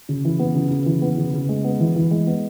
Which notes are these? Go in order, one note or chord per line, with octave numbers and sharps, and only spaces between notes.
C#3
E3
B3
C#3
C#3
E3
B3
C#3
C#3
G#3
B3
E3
E3
G#3
B3